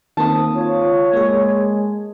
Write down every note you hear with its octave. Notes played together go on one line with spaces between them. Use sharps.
D#3 A#3 C4 A5 D#6
F4 C#5
G#3 A#3 G#4